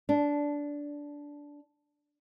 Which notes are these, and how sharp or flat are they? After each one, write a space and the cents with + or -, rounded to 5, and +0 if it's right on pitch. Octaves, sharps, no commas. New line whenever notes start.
D4 -15